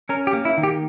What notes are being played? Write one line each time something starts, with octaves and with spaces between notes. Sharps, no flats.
C#4 A#4
G4
A#3
E4
D#3
G4